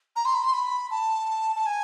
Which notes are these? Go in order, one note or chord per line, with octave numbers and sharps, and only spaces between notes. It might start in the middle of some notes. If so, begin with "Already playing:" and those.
A#5
C6
B5
C6
B5
A5
A5
G#5